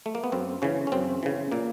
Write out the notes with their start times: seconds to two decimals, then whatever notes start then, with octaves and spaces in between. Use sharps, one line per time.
0.06 A3
0.15 A#3
0.24 B3
0.32 F#2 C4
0.62 C#3 E3 C#4
0.87 C#4
0.92 F#2 C4
1.23 C#3 E3
1.52 A#2 A#3